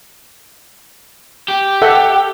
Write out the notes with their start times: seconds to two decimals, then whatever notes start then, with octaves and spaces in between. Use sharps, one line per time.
1.49 G4
1.82 A4 E5 F#5